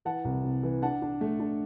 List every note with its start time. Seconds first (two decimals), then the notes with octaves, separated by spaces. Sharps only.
0.05 E3 F#5 A5
0.25 C2
0.44 C3
0.63 E3
0.82 D4 F#5 A5
1.02 D4
1.21 A3
1.40 D4